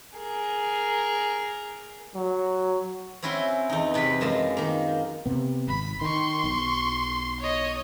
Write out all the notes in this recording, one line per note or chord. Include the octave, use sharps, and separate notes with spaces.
G#4 A#4
F#3
C4 C#4 E4 F#4 G#5 C6
E2 D#4
E2 C3 B4 B5
F#2 G#3 F4 A5
D#3 A#3
C3 B3
G#1 B5
D#3 C6 C#6
B1
C#5 D#5